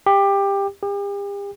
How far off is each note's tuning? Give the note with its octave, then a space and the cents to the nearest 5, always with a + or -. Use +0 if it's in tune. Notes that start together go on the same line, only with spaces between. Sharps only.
G4 +20
G4 +45